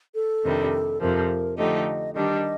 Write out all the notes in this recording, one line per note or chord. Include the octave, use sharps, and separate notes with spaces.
A4
F2 C3 D#3 G3 D4
F2 C3 F3 A#4
D3 F3 A3 D#4 G4 D#5
D#3 G3 D4 G4 D#5